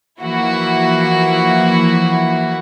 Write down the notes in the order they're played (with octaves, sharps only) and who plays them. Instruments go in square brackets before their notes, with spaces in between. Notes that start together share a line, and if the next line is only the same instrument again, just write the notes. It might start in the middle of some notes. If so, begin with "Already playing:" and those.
[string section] E3 F3 A#3 E4 F#4